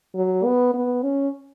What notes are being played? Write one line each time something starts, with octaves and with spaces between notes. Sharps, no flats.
F#3
B3
B3
C#4